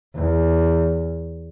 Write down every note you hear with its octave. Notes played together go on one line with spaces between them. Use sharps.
E2